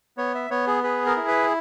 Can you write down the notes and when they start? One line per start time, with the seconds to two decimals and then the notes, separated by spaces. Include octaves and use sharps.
0.17 B3 C#5
0.35 E5
0.50 B3 C#5
0.67 G#4
0.84 G#4 B4
1.06 A#4
1.17 E4
1.28 B4